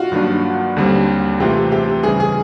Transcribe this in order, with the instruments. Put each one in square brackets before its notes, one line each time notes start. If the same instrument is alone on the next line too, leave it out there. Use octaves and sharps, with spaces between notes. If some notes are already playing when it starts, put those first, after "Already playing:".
Already playing: [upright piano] F4 F#4
[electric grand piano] G2 D#3 F#3 A#3 D4
D#2 D3 G3 C4
[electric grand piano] C3 E3 A3 C4 F4 [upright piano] G4
[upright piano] G4
[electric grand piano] C#3 E3 G3 [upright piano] G#4
[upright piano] G#4